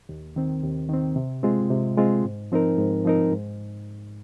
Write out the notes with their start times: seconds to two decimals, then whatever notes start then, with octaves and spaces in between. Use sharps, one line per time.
0.09 D#2
0.36 D#3 C4
0.63 D#2
0.89 D#3 C4
1.16 C3
1.43 G#3 C4 F4
1.70 C3
1.97 G#3 C4 F4
2.24 G#2
2.52 F3 C4 D#4 A#4
2.78 G#2
3.05 F3 C4 D#4 A#4
3.32 G#2